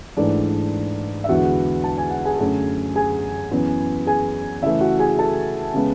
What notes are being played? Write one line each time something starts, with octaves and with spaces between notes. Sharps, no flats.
G#2 E3 A3 D4 D5
E5
E2 D3 G#3 B3 F#4 F#5
A5
G#5
F#5
G#4 G#5
F#2 D3 A3
G#4 G#5
F#2 E3 B3
G#4 G#5
C#3 E3 A3 E4 E5
F#4 F#5
G#4 G#5
A4 A5
C#3 G#3 B3